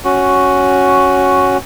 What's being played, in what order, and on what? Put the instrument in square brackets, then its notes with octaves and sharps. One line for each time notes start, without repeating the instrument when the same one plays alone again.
[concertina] C#4 F#4